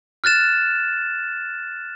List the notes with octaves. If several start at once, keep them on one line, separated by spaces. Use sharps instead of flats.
F6 F#6 A6 E7